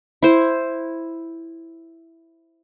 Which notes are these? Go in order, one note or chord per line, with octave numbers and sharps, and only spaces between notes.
E4 C5